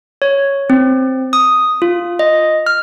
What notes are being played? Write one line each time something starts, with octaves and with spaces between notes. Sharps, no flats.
C#5
C4
D#6
F4
D#5
F6